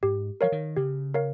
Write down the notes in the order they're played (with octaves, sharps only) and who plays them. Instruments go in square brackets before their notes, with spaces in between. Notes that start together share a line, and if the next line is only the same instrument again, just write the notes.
[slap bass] G#2 [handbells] G4
[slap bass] F3 [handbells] A#4 C#5 F5
[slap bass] D#3
[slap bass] C#3 [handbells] G4
[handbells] A#4 C#5 F5